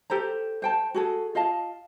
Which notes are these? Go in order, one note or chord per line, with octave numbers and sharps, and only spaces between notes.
G4 A4 C5 A#5
C5 G5 A5
F#4 G#4 A4
F4 D#5 F5 A5